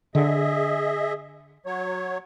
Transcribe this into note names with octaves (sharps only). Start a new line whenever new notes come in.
D3 G#4 D#5 E5
F#3 C#5